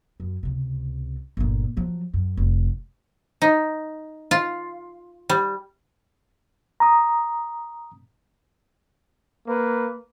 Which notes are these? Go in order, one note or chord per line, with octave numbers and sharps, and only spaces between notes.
F#2
C#2 C3
G1 A#2
F3 F#3
F#2
F1
D#4
F4
G3
A#5 D#6
A#3 B4